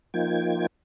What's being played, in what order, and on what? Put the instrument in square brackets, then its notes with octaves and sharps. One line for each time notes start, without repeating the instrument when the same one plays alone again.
[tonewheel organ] F3 A#3 D#4 F4 G5 G#6